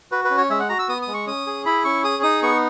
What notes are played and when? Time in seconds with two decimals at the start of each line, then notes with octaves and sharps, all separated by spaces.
0.12 F#4 B4
0.25 B4
0.30 C#4
0.38 C#5
0.50 G#3 E5
0.59 F#5
0.69 F#4 A#5
0.79 E6
0.88 B3 D#6
1.02 D#6
1.08 G#3
1.14 C#6
1.26 C#4 D#6
1.47 G#4
1.66 E4 B5
1.84 C#4 C#6
2.04 G#4 D#6
2.23 D#4 D#6
2.42 B3 C#6